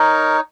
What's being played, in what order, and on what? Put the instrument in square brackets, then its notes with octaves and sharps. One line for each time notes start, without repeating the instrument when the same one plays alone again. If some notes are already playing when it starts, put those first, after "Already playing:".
Already playing: [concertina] D#4 A#4 C#5